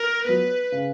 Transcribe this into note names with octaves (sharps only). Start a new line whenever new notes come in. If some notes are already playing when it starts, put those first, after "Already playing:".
Already playing: A#4
F#3 B3 B4
C#3